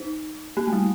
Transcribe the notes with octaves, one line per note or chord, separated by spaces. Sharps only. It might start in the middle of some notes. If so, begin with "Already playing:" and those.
Already playing: D#4
A#3
A3
G3